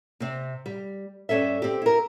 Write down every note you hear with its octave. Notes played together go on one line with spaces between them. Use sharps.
C3 C4
G3
G2 C#4 A4 E5
C4 G4
E4 A#4